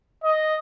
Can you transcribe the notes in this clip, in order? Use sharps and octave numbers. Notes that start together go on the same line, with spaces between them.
D#5